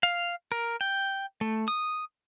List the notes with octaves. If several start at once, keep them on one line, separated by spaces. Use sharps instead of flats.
F5
A#4
G5
A3
D#6